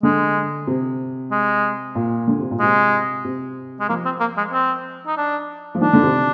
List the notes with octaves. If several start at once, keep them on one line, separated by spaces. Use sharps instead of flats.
D3 G#3
C3
G#3
A#2
D3
C3
A#2
C3 G#3
C3
G#3
F3 A#3
C4
A#3
G#3
C4
D#4
D4
F3
D#3 D4
D3
C3